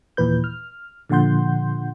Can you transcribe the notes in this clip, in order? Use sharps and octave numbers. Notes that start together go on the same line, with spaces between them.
D#2 A#2 E3 B4 G6
F6
A#2 D3 F3 F#5 C6 G6